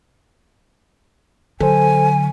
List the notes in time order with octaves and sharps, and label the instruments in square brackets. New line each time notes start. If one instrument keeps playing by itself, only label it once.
[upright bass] D3 F#3 [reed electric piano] A4 C5 [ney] G#5